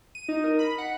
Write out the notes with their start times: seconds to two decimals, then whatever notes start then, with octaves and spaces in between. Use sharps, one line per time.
0.15 D#7
0.29 D#4
0.44 A#4
0.59 B5
0.78 F#5